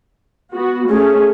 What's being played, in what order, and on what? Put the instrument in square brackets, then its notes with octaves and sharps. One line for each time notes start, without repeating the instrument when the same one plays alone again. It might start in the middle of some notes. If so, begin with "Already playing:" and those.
[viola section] B3 F#4
[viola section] A3 C#4 [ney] G#4